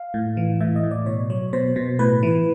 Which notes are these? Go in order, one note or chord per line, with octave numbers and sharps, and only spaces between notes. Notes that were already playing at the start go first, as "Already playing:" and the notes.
Already playing: F5
A2
E3
A2 E5
D#5
A2
D5
B2 C#5
F#3 C#5
B2 C5
B2
A2 B4
E3